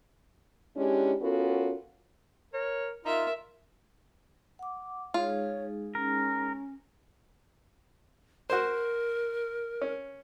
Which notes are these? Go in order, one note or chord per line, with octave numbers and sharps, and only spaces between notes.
G#3 C#4 D4 E4 G4
B3 C#4 F4 F#4 A4 A#4
A#4 C#5
D#4 F4 A#4 E5
F#5 D6
G#3 D#4 F4 G#4 C#5
C#4 A#4
F#4 A#4 C5
C#4